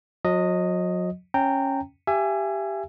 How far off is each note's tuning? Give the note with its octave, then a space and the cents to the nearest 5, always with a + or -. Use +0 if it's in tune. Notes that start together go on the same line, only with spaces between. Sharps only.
F#3 -40 D#5 +0
C#4 -10 G5 +0 A#5 -25
G4 +0 E5 +30 G#5 +0